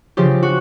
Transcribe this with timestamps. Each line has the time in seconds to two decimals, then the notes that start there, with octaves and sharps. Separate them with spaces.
0.17 C#3 F3 G4
0.43 F#4